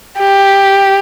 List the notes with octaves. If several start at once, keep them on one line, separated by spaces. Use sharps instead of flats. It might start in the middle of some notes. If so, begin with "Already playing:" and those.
G4